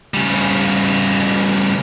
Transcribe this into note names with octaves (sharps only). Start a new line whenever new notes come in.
C#3 G3